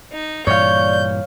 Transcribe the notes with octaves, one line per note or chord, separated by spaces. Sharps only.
D#4
G2 A#2 E3 C#5 D5 F5 G6